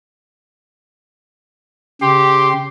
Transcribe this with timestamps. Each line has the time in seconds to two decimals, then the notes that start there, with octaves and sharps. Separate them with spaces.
2.02 C#3 G4 C6